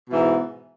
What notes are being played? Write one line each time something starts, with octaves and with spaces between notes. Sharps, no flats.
G#2 B2 E3